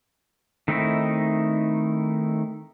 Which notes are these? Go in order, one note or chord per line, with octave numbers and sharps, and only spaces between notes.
D#3 A3 C4 D#4 E4